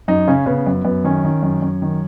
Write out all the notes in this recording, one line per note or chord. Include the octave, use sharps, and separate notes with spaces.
F#2 D#4
C#3 C#4
C#3 B3
F#2
F#2 B3
D#3 C#4
D#3
F#2
F#2
D#3